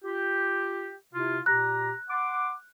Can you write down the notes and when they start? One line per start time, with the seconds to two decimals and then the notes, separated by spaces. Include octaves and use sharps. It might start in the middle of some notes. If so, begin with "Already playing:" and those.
0.05 F4 G4
1.14 C3 E4 F4
1.46 A#2 G4 A#5 F#6
2.09 F#5 C6 D6